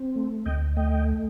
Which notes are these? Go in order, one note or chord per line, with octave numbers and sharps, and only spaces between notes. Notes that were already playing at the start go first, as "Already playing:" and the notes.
Already playing: C4
A3
D2 D#5 G5
A3 D#5 G5